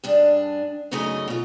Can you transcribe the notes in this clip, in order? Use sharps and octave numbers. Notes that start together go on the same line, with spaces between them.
G2 D4 G#4
F#2 C#3 A3 D#4 D#5 G#5
B2 F4